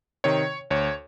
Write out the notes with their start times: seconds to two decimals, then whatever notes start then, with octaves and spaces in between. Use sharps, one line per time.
0.24 C3 D#3 C#5
0.71 D2 C#5